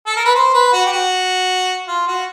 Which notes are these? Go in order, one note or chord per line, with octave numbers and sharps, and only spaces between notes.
A4
A#4
B4
C5
B4
F#4
G4
F#4
F4
F#4